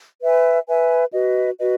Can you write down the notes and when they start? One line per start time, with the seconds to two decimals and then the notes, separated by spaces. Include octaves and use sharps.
0.22 B4 E5 G#5
0.68 B4 E5 G#5
1.13 F#4 B4 D#5
1.59 F#4 B4 D#5